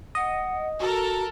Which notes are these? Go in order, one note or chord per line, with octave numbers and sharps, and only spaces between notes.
D#5 F#5
F#4 A4 A#4